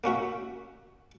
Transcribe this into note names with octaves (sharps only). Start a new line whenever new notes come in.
A#3 C#4 F#4 E5